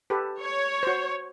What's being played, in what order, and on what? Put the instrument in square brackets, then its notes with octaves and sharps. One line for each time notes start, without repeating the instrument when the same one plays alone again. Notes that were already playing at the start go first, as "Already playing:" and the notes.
[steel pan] G4 A4 B4
[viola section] C#5
[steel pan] F#4 C5